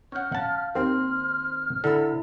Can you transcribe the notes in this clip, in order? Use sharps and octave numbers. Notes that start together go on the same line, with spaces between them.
C#4 C#5 F#5 F6 G6
F5 F#5 A5
D#2 C4 C6 F6
D3 E4 A4 B5 E6